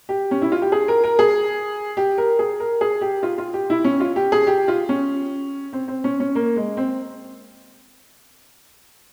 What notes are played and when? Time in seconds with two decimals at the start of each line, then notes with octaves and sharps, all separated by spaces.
0.09 G4
0.31 C#4
0.42 E4
0.52 F4
0.62 G4
0.72 G#4
0.88 A#4
1.04 A#4
1.19 G#4
1.97 G4
2.18 A#4
2.39 G#4
2.60 A#4
2.81 G#4
3.01 G4
3.23 F4
3.38 F4
3.54 G4
3.70 E4
3.84 C#4
4.00 F4
4.16 G4
4.32 G#4
4.47 G4
4.68 F4
4.89 C#4
5.73 C4
5.88 C4
6.04 C#4
6.20 C#4
6.35 A#3
6.56 G#3
6.77 C4